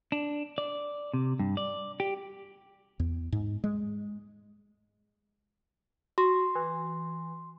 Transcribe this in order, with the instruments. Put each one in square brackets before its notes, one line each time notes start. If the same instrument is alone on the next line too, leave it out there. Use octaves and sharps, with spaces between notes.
[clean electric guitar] D4
D5
C3
G2
D5
G4
[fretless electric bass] E2
G#2
G#3
[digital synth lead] F#4 [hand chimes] C6
[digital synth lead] E3